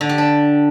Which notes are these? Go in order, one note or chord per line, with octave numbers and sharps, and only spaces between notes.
D3
G4
D4